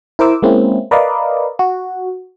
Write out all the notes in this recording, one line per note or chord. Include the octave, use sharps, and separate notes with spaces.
E4 A#4 C5 D6 E6
G#3 A#3 C4 C#4 E4
A#4 B4 D5 D#5 F5
F#4